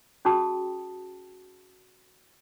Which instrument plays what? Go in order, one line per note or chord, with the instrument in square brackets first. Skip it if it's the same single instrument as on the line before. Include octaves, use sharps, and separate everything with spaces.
[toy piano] C#4 F#4 G#4 G5 A5 D#6